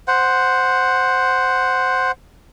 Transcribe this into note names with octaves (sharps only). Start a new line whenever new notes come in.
C5 F#5